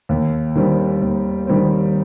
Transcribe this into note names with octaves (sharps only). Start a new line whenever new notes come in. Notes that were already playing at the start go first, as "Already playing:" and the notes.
D#2
D#3 G3 C4
D#2
D#3 G3 C4